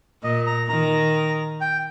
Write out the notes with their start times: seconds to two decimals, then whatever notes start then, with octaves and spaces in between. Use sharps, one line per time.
0.23 A#2 D#5
0.46 A#5
0.69 D#3 A#5
1.61 G5